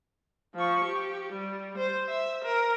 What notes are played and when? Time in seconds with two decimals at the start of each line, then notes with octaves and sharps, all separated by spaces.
0.55 F3 C#6
0.85 G4
1.33 G3
1.78 C5
2.09 E5
2.45 A#4